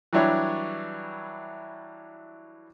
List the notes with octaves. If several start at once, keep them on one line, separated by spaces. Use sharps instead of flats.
E3 F#3 G3 D4 E4 C#5